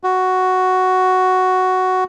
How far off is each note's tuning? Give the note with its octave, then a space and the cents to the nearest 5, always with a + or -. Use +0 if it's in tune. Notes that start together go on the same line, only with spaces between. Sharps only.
F#4 +5